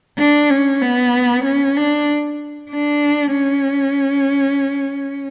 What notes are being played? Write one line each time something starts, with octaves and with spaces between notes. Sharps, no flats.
D4
C#4
B3
C#4
D4
D4
C#4